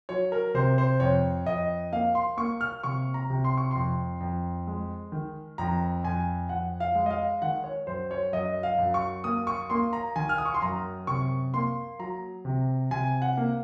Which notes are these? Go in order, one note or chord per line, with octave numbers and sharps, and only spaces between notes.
F#3 C#5
A#4
C3 C5
C5
F2 C#5
F2 D#5
A#3 F5
C6
A#3 C#6
F6
C3 C#6
A#5
C3
C6
C#6
F2 C6
F2
G#3
D#3
F2 A#5
F2 G#5
F2 F#5
F5
G#3
D#5
F5
D#3 F#5
C#5
F#2 C5
C#5
F#2 D#5
F5
F#2
C#6
A#3 D#6
C#6
A#3 C6
A#5
D#3 G#5
F6
D#6
C#6
C6
F#2 A#5
C3 C#6
A#3 C6
F#3 A#5
C3
C3 G#5
F#5
A#3